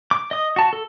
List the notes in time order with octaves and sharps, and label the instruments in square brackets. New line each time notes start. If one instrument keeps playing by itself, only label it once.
[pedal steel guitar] D6
D#5 D#6
F#4 A5
A4